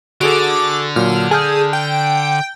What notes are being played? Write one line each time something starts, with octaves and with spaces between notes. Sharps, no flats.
D3 F#4 G#4 A4 D6
A#2 F#3 F6
G#4 A5 F6 G6
G5